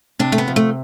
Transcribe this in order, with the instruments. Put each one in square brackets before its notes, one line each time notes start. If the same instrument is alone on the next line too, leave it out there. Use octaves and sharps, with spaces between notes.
[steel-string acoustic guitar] C3 D4
A3
B3
F3
A3